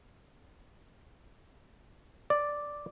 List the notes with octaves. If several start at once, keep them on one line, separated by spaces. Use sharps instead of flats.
D5